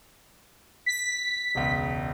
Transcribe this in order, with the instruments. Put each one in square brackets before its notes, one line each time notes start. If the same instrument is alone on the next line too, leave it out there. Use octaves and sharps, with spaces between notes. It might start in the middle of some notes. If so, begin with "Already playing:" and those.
[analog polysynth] B6
[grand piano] E1 C#2